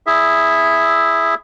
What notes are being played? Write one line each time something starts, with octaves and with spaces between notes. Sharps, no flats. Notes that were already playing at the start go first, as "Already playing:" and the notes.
E4 G#4 E5